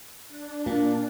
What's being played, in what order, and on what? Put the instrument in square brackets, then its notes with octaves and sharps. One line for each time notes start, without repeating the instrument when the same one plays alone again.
[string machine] D4
[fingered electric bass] A#2 [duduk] A#3